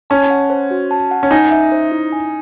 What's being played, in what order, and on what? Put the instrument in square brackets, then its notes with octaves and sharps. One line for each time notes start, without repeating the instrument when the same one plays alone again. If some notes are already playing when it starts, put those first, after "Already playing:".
[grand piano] C#4 [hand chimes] A5
[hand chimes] F#5
C5
F#4
A5
F#5
[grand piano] C#4
[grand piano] D#4 [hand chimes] G#5
[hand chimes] E5
C5
E4
G#5